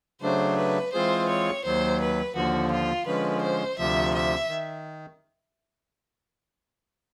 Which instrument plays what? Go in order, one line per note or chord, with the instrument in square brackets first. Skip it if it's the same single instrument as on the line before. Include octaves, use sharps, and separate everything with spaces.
[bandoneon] C#3 F#3 A3 D4 [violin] C5
[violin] B4
[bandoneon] E3 G#3 C4 F4 G#4 [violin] C5
[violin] C#5
[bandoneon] D#2 D#3 F#3 [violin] C5
[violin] B4
[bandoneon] D#2 D3 F3 [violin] F#4
[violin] F4
[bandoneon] D3 F3 G#3 C#4 [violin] B4
[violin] C5
[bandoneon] D2 C3 F3 [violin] E5
[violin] E5
[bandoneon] D#3